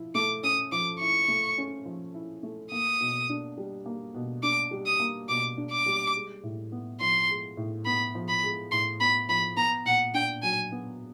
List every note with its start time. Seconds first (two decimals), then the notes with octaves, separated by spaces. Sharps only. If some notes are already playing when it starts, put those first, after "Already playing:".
Already playing: F3 E4
0.15 A3 D6
0.43 C#4 D#6
0.72 F3 D6
1.00 E4 C#6
1.28 A3
1.58 C#4
1.85 F3
2.14 E4
2.43 A3
2.72 A#3 D#6
3.01 B2
3.29 D4
3.57 G3
3.86 A#3
4.14 B2
4.43 D4 D6
4.71 G3
4.86 D#6
5.00 A#3
5.29 B2 D6
5.57 D4
5.71 D6
5.86 G3
6.15 G#3
6.43 A2
6.72 B3
7.00 F3 C6
7.29 G#3
7.57 A2
7.86 B3 B5
8.15 F3
8.28 B5
8.43 G#3
8.71 A2 C6
9.00 B3 B5
9.29 F3 B5
9.57 B3 A#5
9.85 A#2 F#5
10.14 D4 G5
10.42 F#3 G#5
10.72 B3